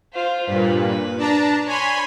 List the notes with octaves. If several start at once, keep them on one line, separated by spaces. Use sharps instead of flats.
F4 C5
G2 A#2 B4
D4 A5 A#5
C#5 G#5 B5 C6